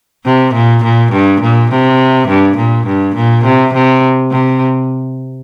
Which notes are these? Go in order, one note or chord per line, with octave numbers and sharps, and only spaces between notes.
C3
A#2
A#2
G2
A#2
C3
G2
A#2
G2
A#2
C3
C3
C3